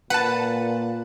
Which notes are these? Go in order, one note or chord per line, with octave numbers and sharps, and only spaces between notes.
A#2 B4 F#5 A5